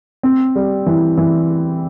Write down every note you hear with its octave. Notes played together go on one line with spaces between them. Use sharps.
C4
G3
E3
E3